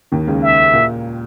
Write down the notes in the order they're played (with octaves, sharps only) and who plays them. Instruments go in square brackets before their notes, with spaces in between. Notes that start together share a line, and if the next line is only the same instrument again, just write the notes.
[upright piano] D#2 D#3
C#2 C#3
[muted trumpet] E5
[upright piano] A#2